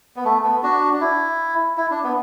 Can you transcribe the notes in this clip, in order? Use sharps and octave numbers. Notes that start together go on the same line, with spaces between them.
B3
A3
B3
D4 F#4
D4
E4
E4
D4
B3